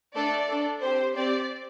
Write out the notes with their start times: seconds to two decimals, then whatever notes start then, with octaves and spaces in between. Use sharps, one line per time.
0.15 A3 D4 A4 D5
0.48 D4 A4
0.81 C4 G4 C5
1.15 C4 G4 D5